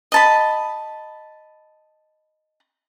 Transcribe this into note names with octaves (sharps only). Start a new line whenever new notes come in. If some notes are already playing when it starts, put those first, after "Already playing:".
D#5 A5 B5